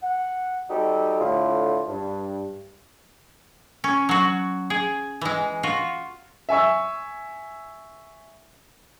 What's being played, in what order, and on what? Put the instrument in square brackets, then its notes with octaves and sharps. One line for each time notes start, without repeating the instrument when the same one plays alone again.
[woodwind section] F#5
G3 C4 D#4 F#4 G4 A4
A2 D3 F4
G2
[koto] C#4
F#3 F#4
G#4
E3 G#3
F4 F#4
[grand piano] E5 G#5 C#6 E6